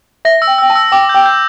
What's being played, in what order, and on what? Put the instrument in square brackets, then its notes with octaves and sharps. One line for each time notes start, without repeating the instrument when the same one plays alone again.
[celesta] E5 [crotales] A#6
[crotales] E6
[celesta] G5
[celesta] G5 [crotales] E6
[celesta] A5
[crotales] E6
[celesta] G5 [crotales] D6
[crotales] G6
[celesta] G5
[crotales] G6